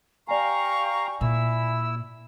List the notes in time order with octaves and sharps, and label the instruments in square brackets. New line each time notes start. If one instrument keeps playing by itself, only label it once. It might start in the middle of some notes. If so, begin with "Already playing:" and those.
[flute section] G4 G5 C#6 [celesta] D5 G#5 [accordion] F5 A#5
[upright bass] A#2 [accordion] E4 E6 [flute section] E5